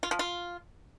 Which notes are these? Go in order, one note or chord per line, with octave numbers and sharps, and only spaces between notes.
F4
F3
F4